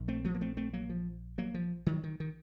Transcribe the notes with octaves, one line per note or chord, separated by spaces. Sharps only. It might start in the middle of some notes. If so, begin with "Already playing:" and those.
Already playing: A#1
A3 C4
F3 A3
A#3
A3 C4
A3 C4
F#3 A#3
F3
F#3 A#3
F3
D#3 F#3
D#3
D#3